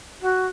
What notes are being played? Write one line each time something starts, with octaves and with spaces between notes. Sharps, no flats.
F#4